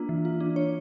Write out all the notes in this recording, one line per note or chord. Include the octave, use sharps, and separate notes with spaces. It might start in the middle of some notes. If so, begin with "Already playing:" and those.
Already playing: A#3 D4 F4
E3
F4
D4
C#5